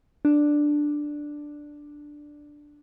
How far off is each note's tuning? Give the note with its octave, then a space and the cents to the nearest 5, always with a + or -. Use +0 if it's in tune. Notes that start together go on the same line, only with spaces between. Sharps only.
D4 +5